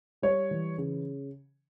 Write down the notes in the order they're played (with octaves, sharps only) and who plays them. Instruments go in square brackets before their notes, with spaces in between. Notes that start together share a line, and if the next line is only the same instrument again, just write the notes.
[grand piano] G3 C#5
E3
C#3